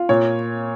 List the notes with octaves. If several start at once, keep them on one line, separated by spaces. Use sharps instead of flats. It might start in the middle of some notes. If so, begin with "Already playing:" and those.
Already playing: F4
A#2 C#5